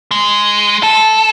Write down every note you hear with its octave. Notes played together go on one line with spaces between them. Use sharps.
G#3
A4